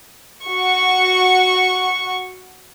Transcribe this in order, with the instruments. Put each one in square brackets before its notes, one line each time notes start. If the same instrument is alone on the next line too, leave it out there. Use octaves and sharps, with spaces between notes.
[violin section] F#4 C#6